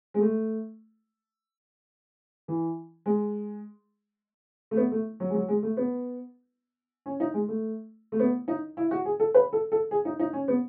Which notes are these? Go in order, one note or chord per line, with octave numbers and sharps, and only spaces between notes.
G#3
A3
E3
G#3
A3
B3
A3
F#3
G#3
F#3
G#3
A3
B3
C#4
D#4
G#3
A3
A3
B3
D#4
E4
F#4
G#4
A4
B4
A4
A4
G#4
D#4
D#4
C#4
B3